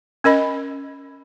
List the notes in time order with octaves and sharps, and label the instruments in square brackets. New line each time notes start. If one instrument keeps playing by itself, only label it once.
[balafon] C#4 A#4 D#5 B5